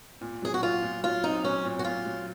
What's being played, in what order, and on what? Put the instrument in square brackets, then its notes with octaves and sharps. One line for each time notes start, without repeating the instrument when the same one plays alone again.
[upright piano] A#2
[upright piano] F#3 [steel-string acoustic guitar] G#4
[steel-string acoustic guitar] F#4
[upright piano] A#2 [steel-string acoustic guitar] F4
[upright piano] A#2
[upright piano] F#3 [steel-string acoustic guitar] F4
[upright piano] C4 [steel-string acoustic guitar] D#4
[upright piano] F#3 [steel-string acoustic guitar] C#4
[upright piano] A#2
[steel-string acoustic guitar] F#4
[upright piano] A#2 [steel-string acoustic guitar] F4
[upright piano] F#3